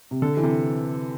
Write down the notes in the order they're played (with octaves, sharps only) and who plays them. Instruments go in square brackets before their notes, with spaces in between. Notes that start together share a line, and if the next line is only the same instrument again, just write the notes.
[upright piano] C3
[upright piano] D3 [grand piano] A4
[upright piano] E3
[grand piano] C3